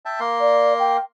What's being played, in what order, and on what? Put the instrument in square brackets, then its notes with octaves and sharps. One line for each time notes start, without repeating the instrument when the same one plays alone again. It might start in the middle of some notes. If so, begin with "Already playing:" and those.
[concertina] E5 G5 A5
A#3 A#4 C6
[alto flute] D5
G5